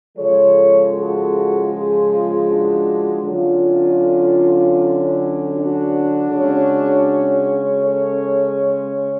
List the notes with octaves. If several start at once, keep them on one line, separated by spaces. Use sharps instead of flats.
C#3 F3 G#3 A4 C#5
F#4 A4
F4 G#4
D4 F#4
D3 F#3 C#4 F4
D4 F#4
C#3 G#3 C#4
A4 C#5